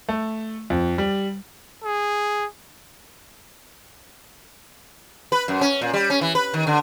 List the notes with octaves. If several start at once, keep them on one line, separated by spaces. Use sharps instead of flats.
A3
F2
G3
G#4
B4
F#2
C#4
A#2
G3
C#4
E3
B4
D#3
D3